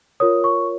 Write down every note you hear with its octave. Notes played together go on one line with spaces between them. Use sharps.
F4 A#4 C#5 D#6
C#6